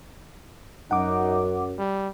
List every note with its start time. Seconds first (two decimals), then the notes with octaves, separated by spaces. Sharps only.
0.91 F#2 D#4 F#5 D6
1.78 G3